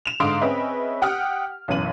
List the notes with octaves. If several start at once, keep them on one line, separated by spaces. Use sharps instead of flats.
E7 F7
G#2 D3 F5 C6 D#6 D7
C4 C#4 G#4 B4 D#5 E5
G4 F#5 G5 D#6 F6
B1 F#2 E3 D#7 F#7